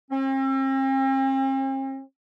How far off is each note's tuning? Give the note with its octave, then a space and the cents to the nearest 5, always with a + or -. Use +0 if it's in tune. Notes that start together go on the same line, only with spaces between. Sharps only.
C4 +45